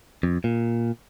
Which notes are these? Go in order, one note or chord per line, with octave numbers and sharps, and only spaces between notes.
F2
A#2